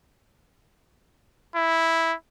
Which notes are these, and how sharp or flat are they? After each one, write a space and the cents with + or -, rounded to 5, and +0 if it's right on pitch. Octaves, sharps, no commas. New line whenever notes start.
E4 -5